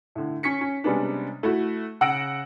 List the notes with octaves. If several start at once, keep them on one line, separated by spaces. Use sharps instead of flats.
A2 D3
C#4 C#6 B6 C#7
C#4
C3 G3 G#3 B3 C#4 D4
A3 E4 F#4
C#3 F#5 E6 A#6 D7